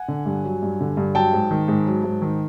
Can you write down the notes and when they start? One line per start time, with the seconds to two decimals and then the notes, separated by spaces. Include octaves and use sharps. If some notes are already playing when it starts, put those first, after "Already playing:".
Already playing: F#5 G#5
0.08 D3
0.26 G2
0.44 F#3
0.62 G2
0.80 D3
0.97 G2
1.15 F#3 G5 A5
1.33 G#2
1.51 D#3
1.68 G#2
1.87 F#3
2.04 G#2
2.22 D#3